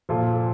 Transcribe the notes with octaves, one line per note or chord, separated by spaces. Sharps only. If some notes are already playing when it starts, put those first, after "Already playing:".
A#2 F3 F4 A4